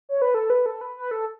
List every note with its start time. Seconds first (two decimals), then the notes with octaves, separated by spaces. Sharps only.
0.09 C#5
0.22 B4
0.34 A4
0.50 B4
0.66 A4
0.81 B4
0.97 B4
1.11 A4